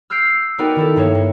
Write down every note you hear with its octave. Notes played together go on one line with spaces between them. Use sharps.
E6 F6 G6 C7 D7
B3 D#4 F#4 A#4 D5 G5
D#3 E4 A4
G2 A#3 C#5 E7
A#3